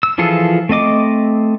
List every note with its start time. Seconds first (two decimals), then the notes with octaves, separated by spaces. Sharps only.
0.03 E6
0.18 E3 F3 F4 G#4 A4
0.69 A3 C4 D#5 D6